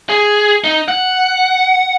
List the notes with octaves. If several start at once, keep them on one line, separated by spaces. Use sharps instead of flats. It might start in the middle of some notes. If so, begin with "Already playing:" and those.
G#4
D#4
F#5